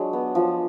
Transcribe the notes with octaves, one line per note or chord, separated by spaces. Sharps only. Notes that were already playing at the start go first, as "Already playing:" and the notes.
Already playing: F#3 G#3 D4
B3
F3